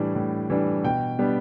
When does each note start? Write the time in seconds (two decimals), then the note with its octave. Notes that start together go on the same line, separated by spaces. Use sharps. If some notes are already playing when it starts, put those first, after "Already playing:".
Already playing: A2 E3 G3 D4
0.15 A2
0.50 E3 G3 D4
0.84 B2 G5
1.19 G3 B3 D4